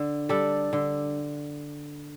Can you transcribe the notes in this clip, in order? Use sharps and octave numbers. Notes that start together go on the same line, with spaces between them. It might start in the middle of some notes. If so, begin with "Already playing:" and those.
Already playing: D3
G3 D4 A4
D3